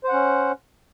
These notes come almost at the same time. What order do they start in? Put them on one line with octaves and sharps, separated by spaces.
C5 F#5 C#4